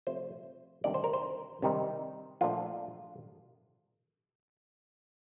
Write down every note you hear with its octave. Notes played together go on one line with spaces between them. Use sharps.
C3 F3 A3 C5
D2 C3 D#3 G3 D4 D5
C5
A#4
C5
C3 D#3 G3 C4 D#4
A#2 F3 A3 D4 F4